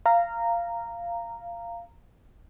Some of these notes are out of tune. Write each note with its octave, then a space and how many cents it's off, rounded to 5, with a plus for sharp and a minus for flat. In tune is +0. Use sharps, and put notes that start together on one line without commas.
F5 -15 A#5 -10